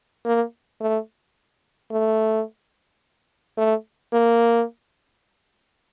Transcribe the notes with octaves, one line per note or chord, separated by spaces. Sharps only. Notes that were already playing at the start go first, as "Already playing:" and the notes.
A#3
A3
A3
A3
A#3